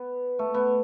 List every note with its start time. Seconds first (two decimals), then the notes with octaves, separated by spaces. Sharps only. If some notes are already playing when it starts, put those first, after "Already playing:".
Already playing: B3
0.39 A3
0.54 B3